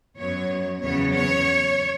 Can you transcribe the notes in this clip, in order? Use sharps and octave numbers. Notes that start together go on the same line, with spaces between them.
F#2 F#3 B3 C#5
E2 C#3 F#3 B3 C#5
C#5